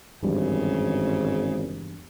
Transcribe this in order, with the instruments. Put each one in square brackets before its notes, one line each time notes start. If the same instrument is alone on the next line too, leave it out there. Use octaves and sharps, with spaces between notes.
[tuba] G#1 [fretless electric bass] E2 G2 G3 [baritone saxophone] C#3